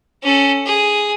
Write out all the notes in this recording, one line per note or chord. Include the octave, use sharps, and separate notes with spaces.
C#4 A4
G#4